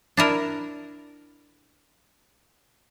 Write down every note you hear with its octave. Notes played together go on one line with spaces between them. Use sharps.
D4 E4 A#4